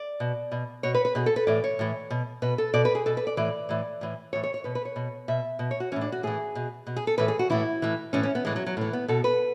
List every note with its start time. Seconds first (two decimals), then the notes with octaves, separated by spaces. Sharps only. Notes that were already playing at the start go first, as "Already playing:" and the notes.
Already playing: D5
0.20 B2
0.52 B2
0.83 B2 C#5
0.94 B4
1.05 B4
1.15 B2 G#4
1.26 A4
1.36 B4
1.47 A2 E3 D5
1.64 C#5
1.79 A2 E3
2.10 B2
2.42 B2 B4
2.58 A4
2.74 B2 D5
2.85 B4
2.95 G#4
3.06 B2 A4
3.17 B4
3.27 D5
3.37 A2 E3 D5
3.69 A2 E3
4.01 A2 E3
4.33 A2 E3 C#5
4.44 C#5
4.54 C#5
4.64 B2 B4
4.75 B4
4.85 C#5
4.96 B2
5.28 B2 E5
5.59 B2
5.71 C#5
5.80 F#4
5.92 E3 C#4
5.96 A2
6.01 D4
6.12 F#4
6.23 A2 E3 G#4
6.55 B2
6.87 B2
6.97 G#4
7.07 A4
7.18 A2 E3 B4
7.28 G#4
7.39 F#4
7.50 A2 E3 E4
7.82 A2 E3
8.13 A2 E3 C#4
8.23 C#4
8.35 B3
8.45 A2 E3 G#3
8.56 F#3
8.66 F#3
8.77 A2 E3
8.93 B3
9.08 B2 A4
9.24 B4